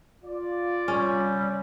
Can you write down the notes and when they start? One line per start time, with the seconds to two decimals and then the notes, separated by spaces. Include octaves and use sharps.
0.24 F4 D5
0.88 G3 C#4